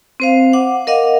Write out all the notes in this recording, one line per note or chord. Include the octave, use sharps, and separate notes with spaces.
C4 C5 F5
F#5 D6
A#4 D#5 F5 F#5